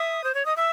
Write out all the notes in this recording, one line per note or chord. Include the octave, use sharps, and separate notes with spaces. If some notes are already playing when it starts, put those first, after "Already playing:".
Already playing: E5 D#6
C5
C#5
D#5 D#6
E5 E6